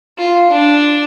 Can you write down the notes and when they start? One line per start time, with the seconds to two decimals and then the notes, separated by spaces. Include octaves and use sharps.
0.18 F4
0.49 D4